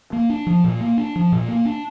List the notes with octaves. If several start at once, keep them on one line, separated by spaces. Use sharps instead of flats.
A#3
D4
F3
A#2
A#3
D4
F3
A#2
A#3
D4